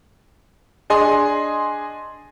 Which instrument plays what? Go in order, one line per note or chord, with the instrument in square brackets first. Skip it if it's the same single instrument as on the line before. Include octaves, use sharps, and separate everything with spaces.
[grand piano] D4 G#4 D#5 G#5 C6